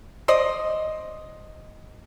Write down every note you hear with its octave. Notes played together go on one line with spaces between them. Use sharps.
C5 D5 D#5